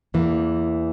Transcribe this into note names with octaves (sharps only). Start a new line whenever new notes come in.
E2 E3 A#3